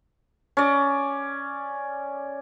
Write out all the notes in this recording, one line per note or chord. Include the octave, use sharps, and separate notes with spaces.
C#4 D5